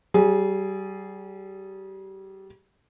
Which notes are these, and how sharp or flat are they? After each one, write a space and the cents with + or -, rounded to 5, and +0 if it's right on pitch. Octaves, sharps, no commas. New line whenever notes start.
G3 -30 G#4 +0